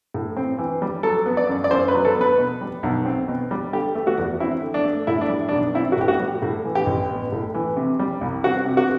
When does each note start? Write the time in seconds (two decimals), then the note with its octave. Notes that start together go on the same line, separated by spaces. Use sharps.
0.14 A2
0.37 C4
0.58 E3
0.82 G3
1.03 F#3 A4
1.26 B3
1.37 D5
1.49 F#2
1.64 D5
1.71 F#2 C5
1.88 B4
1.94 F#3
2.05 A4
2.16 B3
2.21 B4
2.38 B2
2.61 G3
2.83 B1
3.06 C4
3.28 B2
3.51 G3
3.73 D3 G4
3.95 A3
4.07 F#4
4.18 E2
4.40 C4 E4
4.62 D3
4.74 D4
4.85 A3
5.07 A2 E4
5.21 D4
5.30 G3
5.49 D4
5.52 B1
5.75 C4 E4
5.92 F#4
5.97 A2 G4
6.08 F#4
6.20 G3
6.42 A2
6.65 E3
6.75 G4
6.86 A1
7.10 B3
7.32 A2
7.54 E3
7.77 C3
7.99 G3
8.21 C2
8.44 C4 F#4
8.66 C3
8.77 F#4